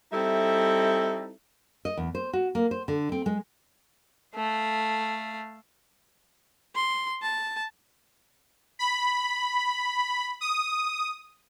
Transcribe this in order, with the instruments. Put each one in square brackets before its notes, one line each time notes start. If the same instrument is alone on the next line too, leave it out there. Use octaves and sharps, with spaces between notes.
[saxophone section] G3 C4 D#4 E4 A4 E5
[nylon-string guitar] D#5
E2
C5
F#4
A#3
C5
D3
C4
G#3
[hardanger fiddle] A3 F5
[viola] C6
A5
[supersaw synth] B5
D#6